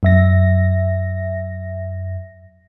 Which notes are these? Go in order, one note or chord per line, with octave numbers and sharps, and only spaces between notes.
F#2 E5 A#6